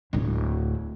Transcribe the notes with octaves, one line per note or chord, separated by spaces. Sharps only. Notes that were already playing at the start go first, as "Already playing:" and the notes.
D1 E4